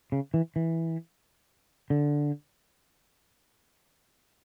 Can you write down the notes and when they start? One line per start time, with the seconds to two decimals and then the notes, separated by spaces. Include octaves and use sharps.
0.12 C#3
0.34 E3
0.56 E3
1.90 D3